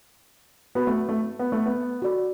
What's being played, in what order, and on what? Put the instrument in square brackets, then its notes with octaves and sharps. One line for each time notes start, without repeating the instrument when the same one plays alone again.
[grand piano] B3 [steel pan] F#4 B4 F#5 B5
[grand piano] A3
A3
B3
A3
B3
[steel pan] F#4 A4 D5 B5